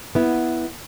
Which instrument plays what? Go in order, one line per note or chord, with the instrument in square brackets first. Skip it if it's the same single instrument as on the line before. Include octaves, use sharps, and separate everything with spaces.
[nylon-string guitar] B3 E4